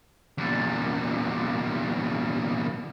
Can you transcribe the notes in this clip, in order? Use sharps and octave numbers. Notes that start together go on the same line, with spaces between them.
E2 A#2